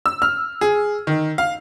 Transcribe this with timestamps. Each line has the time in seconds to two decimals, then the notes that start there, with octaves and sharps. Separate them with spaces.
0.06 E6
0.22 F6
0.61 G#4
1.07 D#3
1.38 F5